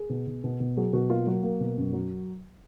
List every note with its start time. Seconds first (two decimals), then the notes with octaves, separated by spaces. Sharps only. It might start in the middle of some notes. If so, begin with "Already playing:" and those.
Already playing: G#4
0.09 B2
0.27 B2
0.44 B2
0.60 B2
0.77 F#3 G#4
0.93 B2 F#4
1.10 A#3 F4
1.27 F#3 F#4
1.43 A#3
1.60 B2
1.77 F#2
1.93 F#3